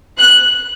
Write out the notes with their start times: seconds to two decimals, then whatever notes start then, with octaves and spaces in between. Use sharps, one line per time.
0.18 F#6